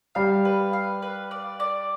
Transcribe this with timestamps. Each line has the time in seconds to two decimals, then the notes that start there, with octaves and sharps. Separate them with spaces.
0.15 G3 F5
0.45 B4
0.73 F5
1.02 B4
1.31 D5
1.60 D5